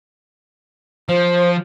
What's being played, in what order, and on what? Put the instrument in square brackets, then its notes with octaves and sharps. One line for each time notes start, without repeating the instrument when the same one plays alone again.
[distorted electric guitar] F3 [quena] C5